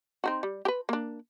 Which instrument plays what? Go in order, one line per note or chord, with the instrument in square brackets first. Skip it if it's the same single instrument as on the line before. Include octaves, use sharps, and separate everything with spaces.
[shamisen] C4 D#4 F#4
G3
G4 B4
A#3 D4